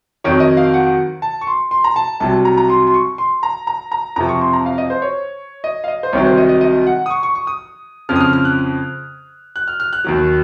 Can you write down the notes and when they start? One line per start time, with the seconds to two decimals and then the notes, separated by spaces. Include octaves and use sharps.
0.24 F2 D#3 F#3 C#5
0.40 D#5
0.57 F5
0.74 F#5
1.22 A5
1.41 C#6
1.47 C6
1.71 C6
1.84 A#5
1.96 A5
2.20 C2 C3 F#3 A5
2.45 A#5
2.57 A#5
2.70 C6
2.87 C6
2.94 C#6
3.18 C6
3.43 A#5
3.67 A#5
3.92 A#5
4.16 F2 C3 F3 A#5
4.29 C#6
4.41 C6
4.53 A#5
4.66 F5
4.78 D#5
4.90 C5
5.02 C#5
5.64 D#5
5.84 F5
5.88 D#5
6.03 C5
6.13 C2 C3 D#3 F#3 C#5
6.25 C5
6.37 D#5
6.49 D#5
6.61 D#5
6.87 F#5
7.06 D#6
7.10 C#6
7.23 C#6
7.35 C#6
7.47 D#6
8.09 F2 C#3 F3 F6
8.16 D#6
8.20 F6
8.33 F6
8.45 F#6
9.56 F#6
9.68 F6
9.80 F6
9.93 F#6
10.04 D#2 D#3 F#3